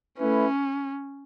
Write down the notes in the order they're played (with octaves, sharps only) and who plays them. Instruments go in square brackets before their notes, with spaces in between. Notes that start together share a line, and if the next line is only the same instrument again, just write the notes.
[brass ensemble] A3 E4 B4 [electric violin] C#4